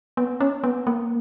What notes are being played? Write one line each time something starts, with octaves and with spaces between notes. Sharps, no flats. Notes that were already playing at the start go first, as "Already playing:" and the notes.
B3
C#4
B3
A#3